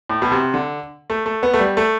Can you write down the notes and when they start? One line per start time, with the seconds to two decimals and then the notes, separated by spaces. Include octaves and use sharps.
0.09 A2
0.22 B2
0.32 C3
0.54 D3
1.10 A3
1.26 A3
1.43 B3
1.54 A3
1.60 G3
1.77 A3